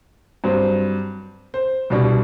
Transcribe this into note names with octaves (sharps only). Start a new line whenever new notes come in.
G2 F#3 C4 C5
C5
C2 B2 G3 D4